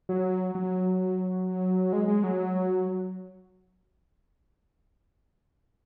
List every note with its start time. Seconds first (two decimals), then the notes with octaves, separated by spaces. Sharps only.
0.09 F#3
0.55 F#3
1.93 G#3
2.08 G#3
2.24 F#3